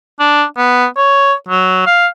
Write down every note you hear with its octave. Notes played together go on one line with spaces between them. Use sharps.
D4
B3
C#5
F#3
F5